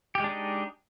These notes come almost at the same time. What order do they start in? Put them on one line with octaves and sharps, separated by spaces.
G4 G#3 D4 D#4